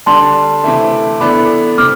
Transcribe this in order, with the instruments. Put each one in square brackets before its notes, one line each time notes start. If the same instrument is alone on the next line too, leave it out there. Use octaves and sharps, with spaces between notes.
[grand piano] D3 G3 D4 [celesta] A5 C6
[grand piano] C3 E3 A3 [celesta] A5 C6
[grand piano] E3 B3 D4 A4 [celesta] B5 D6
[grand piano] C3 [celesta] D6 F6